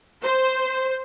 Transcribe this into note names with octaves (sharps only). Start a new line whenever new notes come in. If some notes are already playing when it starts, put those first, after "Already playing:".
C5